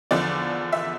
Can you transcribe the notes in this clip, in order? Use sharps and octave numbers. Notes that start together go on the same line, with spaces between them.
E2 D3 F3 D5
E5